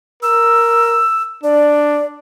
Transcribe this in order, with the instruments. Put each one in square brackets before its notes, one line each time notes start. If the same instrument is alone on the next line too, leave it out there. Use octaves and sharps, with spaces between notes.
[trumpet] A#4 [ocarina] E6
[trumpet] D4 [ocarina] D5